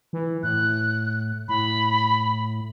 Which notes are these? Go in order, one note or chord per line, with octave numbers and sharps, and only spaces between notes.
E3
A2 F#6
A2 B5